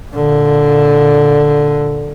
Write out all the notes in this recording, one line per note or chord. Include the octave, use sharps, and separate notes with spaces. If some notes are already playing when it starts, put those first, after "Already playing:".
A#2 D3